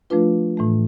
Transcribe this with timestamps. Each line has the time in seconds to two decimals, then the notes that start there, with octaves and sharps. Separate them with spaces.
0.10 F3 A3 D4 F4 B4
0.57 A2 E3 A3